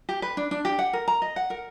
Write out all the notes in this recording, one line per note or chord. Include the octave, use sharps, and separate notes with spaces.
G4
B4
D4
D4
G4
F#5
A#4
A#5
D#5
F#5
A#4